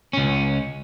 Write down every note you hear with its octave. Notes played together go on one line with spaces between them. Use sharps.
C#2 C#4